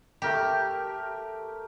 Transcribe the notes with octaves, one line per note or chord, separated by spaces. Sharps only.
A3 G4 A#4 D6